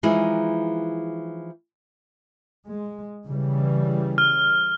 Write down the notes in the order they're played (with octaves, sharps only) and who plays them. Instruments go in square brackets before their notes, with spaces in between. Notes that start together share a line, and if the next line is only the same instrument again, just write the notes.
[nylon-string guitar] E3 F3 G#3 D#4 E4 G#4
[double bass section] G#3
C#3 E3 G3
[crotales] F6